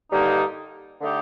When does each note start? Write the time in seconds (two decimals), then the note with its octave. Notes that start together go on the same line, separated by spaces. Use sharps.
0.12 G2 D3 G3 A#3 D#4
1.01 D3 A3 D#4 G4